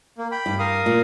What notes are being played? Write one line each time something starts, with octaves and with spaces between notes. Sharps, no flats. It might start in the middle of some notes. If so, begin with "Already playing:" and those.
A#3
G5 B5
G2
A#4 F5 D#6
A#2